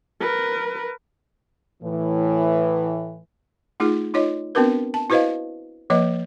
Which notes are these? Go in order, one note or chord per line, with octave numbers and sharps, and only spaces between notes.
A#4 B4
A2 E3
A3 D#4 F4 G#4
D#4 F4 C#5 D#5
B3 C4 D4 F#4 A#4 B4
A5
E4 F#4 B4 C5 D#5 F5
F3 A#3 B4 D#5 E5